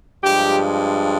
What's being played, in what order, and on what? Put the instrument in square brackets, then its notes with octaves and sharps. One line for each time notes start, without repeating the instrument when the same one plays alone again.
[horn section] G2 F3 G#3 G4